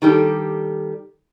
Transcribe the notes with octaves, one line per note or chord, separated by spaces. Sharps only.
D#3 G3 G4 A4